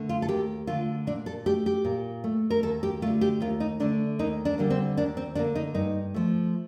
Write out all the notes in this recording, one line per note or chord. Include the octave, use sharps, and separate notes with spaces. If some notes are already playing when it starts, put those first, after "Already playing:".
Already playing: D3 A3
F4
A4
D#2 G4
D3 A3 F4
A#2 D4
A4
A3 G4
G4
A#2
A3
A#4
D#2 A4
G4
D3 A3 F4
G4
D#2 F4
D#4
D3 A3 D4
D#2 D#4
D4
D3 G3 A#3
C4
D#2 D4
C4
D3 G3 A#3 D4
D#4
G2 D#4
F3 A3